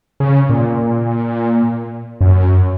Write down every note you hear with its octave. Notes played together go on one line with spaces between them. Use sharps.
C#3
A#2
F#2